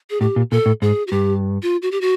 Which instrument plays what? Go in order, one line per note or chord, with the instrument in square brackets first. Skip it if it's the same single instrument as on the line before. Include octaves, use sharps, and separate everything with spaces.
[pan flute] G#4
[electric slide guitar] A2 [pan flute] G4
[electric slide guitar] A#2
[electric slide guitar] A#2 [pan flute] A4
[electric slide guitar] A2
[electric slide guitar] G#2 [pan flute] G#4
[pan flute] F#4
[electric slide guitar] G2 [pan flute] G4
[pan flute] F4
F#4
G4
F#4